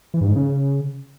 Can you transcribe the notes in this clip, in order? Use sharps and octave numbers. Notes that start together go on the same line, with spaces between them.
E3
G2
G#2
C#3